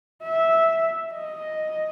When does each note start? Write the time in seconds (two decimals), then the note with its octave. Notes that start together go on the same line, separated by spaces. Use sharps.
0.23 E5
1.14 D#5